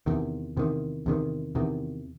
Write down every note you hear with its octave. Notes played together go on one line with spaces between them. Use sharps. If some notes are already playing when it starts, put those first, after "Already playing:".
E2 C3 D#3
E2 C3 D#3
E2 C3 D#3
E2 C3 D#3